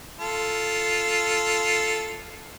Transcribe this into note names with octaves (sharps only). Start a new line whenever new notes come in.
F4 A4